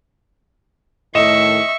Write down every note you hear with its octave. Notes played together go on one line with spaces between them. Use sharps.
A2 D#3 A3 D#5 E5 C#6 E7